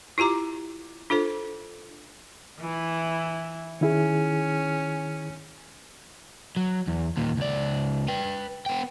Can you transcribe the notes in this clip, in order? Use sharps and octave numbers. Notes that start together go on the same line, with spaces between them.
E4 F4 G4 A#5 D6
D4 F4 A4 C5
E3 E4
D#3 C#4 E4 G#4
F#3
E2
D#2 A#2
C#2 D5
B4 G5
B3 G5